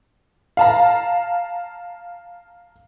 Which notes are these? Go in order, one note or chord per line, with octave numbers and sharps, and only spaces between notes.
F5 A5 A#5